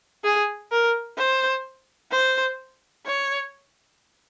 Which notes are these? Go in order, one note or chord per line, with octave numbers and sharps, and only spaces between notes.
G#4
A#4
C5
C5
C#5